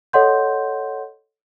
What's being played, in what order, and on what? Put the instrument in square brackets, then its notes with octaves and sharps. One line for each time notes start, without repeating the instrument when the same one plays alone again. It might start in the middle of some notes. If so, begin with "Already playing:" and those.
[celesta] A4 C#5 D#5 F#5 C6 G6